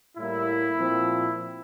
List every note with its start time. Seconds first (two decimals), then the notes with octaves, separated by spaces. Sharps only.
0.18 A2 G3 A#3 E4
0.78 A#2 F3 C4